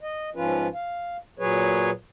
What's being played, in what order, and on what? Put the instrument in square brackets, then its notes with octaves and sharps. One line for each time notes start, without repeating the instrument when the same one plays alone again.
[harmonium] D#5
G#2 F3 C#4 F4 B4
F5
A#2 F#3 G#4 B4 C#5